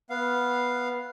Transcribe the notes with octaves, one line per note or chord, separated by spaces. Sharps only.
B3 F5